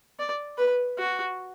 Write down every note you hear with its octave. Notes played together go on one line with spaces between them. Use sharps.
D5
B4
F#4